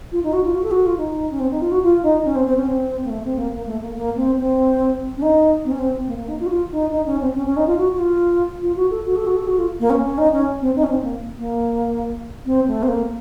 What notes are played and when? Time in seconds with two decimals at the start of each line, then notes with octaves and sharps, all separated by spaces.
0.12 F4
0.23 D#4
0.33 F#4
0.44 F4
0.55 F#4
0.64 A4
0.71 F#4
0.86 F4
0.97 D#4
1.31 C#4
1.39 C4
1.51 D#4
1.61 F4
1.71 F#4
1.83 F4
2.03 D#4
2.25 C#4
2.35 C4
2.46 C4
2.57 C#4
2.67 C4
3.05 A#3
3.10 A3
3.25 C4
3.38 A#3
3.53 A#3
3.66 A3
3.81 A#3
3.95 A#3
4.16 C4
4.38 C4
5.17 C#4
5.22 D#4
5.65 C4
5.71 C#4
5.78 C4
6.07 A#3
6.18 A#3
6.28 D#4
6.40 F4
6.46 F#4
6.50 F4
6.71 D#4
6.92 D#4
7.07 C#4
7.21 C4
7.35 C#4
7.46 C#4
7.57 D#4
7.67 F4
7.78 F#4
7.92 F#4
7.98 F4
8.62 F4
8.76 F#4
8.91 A4
9.06 F#4
9.16 A4
9.27 F#4
9.37 A4
9.47 F#4
9.58 F4
9.80 A#3
9.90 C#4
10.05 C#4
10.18 D#4
10.33 C#4
10.61 C4
10.76 D#4
10.83 C#4
10.89 C4
11.03 A#3
11.38 A#3
12.45 C4
12.67 A3
12.83 C4
12.88 A#3